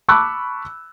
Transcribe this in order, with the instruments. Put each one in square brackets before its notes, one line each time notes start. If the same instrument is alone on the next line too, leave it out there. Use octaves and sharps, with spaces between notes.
[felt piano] A5 B5 C#6 D6 E6 F#6